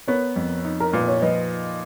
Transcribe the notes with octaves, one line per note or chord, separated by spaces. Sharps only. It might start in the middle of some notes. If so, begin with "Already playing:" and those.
B3 A#4 C#5
F2
D#4
A#4
A#2 B4
C#5
F3 B4 D#5